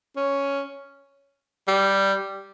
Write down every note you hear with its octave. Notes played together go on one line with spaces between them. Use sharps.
C#4
G3